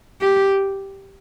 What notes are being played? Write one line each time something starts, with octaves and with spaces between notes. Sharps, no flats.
G4